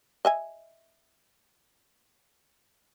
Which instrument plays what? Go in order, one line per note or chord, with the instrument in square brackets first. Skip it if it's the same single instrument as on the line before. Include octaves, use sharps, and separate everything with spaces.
[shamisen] D#5 E5 G#5